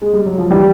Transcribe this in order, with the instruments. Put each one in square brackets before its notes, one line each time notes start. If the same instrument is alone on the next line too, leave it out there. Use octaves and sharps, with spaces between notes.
[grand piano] G#3
G3
F#3
F3
[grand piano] E3 [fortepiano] G3